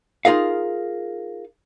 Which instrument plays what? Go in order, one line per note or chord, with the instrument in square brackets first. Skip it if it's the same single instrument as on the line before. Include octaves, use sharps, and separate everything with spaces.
[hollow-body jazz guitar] D#4 F4 G#4 A#4 F5